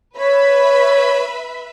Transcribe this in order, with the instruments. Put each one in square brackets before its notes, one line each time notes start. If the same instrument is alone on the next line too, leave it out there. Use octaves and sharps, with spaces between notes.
[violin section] B4 E5 B5 [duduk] C#5